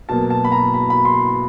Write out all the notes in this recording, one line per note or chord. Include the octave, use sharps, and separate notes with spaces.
B2 F#3 A#3 A5
A5
B5
A#5
B5
B5
C6